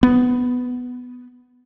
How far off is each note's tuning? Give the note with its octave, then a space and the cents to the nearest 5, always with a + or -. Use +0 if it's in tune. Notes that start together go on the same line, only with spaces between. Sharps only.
B3 +5